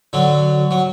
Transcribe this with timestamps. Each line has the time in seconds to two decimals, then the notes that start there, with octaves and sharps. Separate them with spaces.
0.13 D3 F#3
0.71 F#3